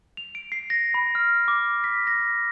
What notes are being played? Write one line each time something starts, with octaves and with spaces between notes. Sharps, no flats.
F7
D7
C7
A#6
B5
F6
D6
B6
A#6